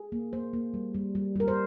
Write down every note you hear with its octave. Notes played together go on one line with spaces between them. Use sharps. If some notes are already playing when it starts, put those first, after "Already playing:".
Already playing: G#4
A#3
A#3 C5
A#3
G3
G3
G3
G3 A#4
C5